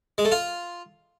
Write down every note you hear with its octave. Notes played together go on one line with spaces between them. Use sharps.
G#3
A3
F4